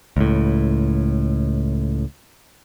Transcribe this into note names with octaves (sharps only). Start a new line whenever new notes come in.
C#2 A2